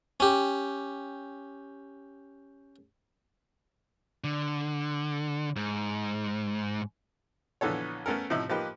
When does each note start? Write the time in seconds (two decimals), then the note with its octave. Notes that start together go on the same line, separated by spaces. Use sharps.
0.20 C#4 G4
4.24 D3
5.56 G#2
7.61 A#1 D3 E3 B3 A4 C#5
8.06 A3 B3 C#4 A4 A#4
8.30 A2 C3 F3 D#4 E4
8.49 F3 A#3 D#4 G4 B4